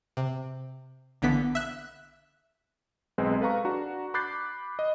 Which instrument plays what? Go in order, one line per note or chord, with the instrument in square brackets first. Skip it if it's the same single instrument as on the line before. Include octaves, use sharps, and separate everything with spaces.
[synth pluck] C3
A#1 D3 E3 B3 B6
E5 F#6
[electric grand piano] B1 G#3 C4 B4
A4 B4 F5 A#5 C#6
D4 F#4 A#5
B5 D6 F#6 G6 A6 C7
D#5